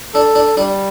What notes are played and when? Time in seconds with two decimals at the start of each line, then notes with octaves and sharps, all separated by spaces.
0.14 D4 A4
0.35 D4
0.57 G3 D4